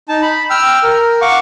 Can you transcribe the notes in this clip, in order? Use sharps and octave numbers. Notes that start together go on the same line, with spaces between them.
D#4 A5
B5
G5 E6 F6
A#4
F5 F#5 C#6 D6